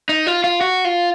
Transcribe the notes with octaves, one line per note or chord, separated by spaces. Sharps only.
D#4
F4
F4
F#4
F4